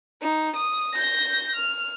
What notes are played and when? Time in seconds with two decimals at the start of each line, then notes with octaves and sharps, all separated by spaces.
0.22 D#4
0.55 D#6
0.94 G6 A#6
1.55 F6